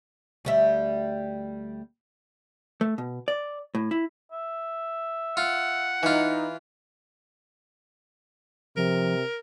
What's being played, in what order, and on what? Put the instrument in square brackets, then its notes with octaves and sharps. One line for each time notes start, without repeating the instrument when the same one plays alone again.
[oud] D2 G3 E5
[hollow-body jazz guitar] A3
B2
D5
A2
E4
[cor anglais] E5
[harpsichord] F4 [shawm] F#5
[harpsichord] E3 F4 [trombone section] D#4 [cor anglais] B4
[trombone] C3 [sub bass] F3 [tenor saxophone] A#4